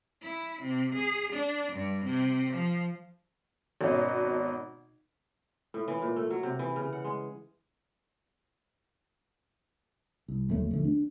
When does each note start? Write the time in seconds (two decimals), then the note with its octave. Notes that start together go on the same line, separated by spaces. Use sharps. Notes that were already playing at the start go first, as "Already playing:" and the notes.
0.22 E4
0.62 C3
0.94 G#4
1.33 D4
1.72 G2
2.05 C3
2.53 F3
3.81 G#1 B2 C#4 D#5
5.74 A2
5.88 E3
6.02 A#2
6.16 A3
6.31 F#3
6.43 C3
6.59 E3
6.76 C#3
6.93 F#5
7.04 G#3
10.28 C2
10.49 G1 D#2 F#3 A3
10.71 D#1 A#1 D3 A3
10.85 D4